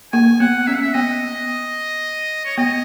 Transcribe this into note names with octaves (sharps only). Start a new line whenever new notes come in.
A#3 G#5
B3 F#5
C#4 E5
F#5
E5
B3 D#5
C#5
B3 D#5